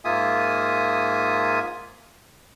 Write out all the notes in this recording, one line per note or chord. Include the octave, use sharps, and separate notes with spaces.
G#2 A#3 F4 E5 G#5 D#6